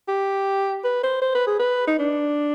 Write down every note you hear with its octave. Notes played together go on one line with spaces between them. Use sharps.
G4
B4
C5
C5
B4
G#4
B4
D#4
D4